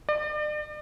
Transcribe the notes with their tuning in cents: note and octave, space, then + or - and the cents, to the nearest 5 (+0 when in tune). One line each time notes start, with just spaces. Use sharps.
D5 +40